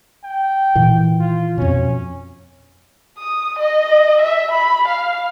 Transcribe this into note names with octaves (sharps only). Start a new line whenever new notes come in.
G5
A#2 D#3 E3
F4
F2 B2 C#4
D#6
D#5
E5
B5
F5